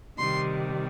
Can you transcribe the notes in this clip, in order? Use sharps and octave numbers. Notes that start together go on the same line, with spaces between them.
C3 D#3 G3 C6